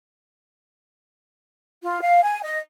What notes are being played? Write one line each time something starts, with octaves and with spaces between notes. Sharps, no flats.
F4
F5
G#5
D#5